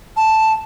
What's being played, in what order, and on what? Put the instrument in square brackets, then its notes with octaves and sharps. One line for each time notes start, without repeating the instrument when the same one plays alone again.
[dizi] A5